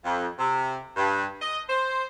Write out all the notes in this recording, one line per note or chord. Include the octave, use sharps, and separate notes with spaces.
F2
C3
G2
D#5
C5